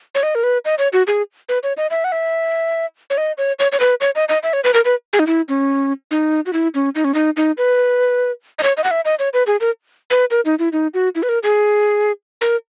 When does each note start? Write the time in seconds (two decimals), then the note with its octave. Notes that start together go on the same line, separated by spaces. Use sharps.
0.15 C#5
0.23 D#5
0.35 A#4
0.43 B4
0.65 D#5
0.79 C#5
0.93 F#4
1.07 G#4
1.49 B4
1.63 C#5
1.77 D#5
1.91 E5
2.04 F#5
2.12 E5
3.10 C#5
3.18 D#5
3.38 C#5
3.59 C#5
3.72 C#5
3.80 B4
4.01 C#5
4.16 D#5
4.29 D#5
4.43 E5
4.53 C#5
4.64 B4
4.74 A#4
4.85 B4
5.13 G#4
5.19 D#4
5.27 E4
5.49 C#4
6.11 D#4
6.46 F#4
6.53 E4
6.75 C#4
6.95 D#4
7.04 C#4
7.14 D#4
7.37 D#4
7.58 B4
8.59 D#5
8.63 C#5
8.77 D#5
8.84 F#5
8.91 E5
9.05 D#5
9.19 C#5
9.34 B4
9.47 G#4
9.61 A#4
10.10 B4
10.31 A#4
10.45 D#4
10.59 E4
10.73 D#4
10.94 F#4
11.15 E4
11.23 B4
11.29 A#4
11.43 G#4
12.41 A#4